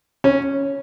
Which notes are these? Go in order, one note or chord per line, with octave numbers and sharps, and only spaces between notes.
C#4